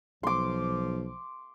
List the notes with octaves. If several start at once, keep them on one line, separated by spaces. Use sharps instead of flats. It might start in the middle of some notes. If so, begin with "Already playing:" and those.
B1 F3 C6 D6